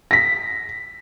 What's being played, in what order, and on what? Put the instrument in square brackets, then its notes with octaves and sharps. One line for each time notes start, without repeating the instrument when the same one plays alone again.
[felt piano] A#6 B6